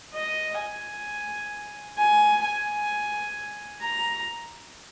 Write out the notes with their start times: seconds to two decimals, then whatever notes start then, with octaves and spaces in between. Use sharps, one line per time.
0.15 D#5
0.60 G#5
1.98 G#5
2.43 G#5
3.81 A#5